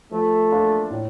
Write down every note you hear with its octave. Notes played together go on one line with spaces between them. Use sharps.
F3 A3
A#3 D4 F4
A2